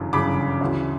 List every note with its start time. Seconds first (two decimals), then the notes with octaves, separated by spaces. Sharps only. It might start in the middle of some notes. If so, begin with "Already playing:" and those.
Already playing: G1 F#2 C#3 E3
0.13 G1 F#2 C#3 E3 B5 D6
0.61 D2 C#3 E3